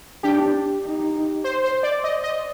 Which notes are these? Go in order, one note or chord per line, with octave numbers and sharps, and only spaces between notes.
D4 G4
D#4
C5
C5
D5
D#5
D#5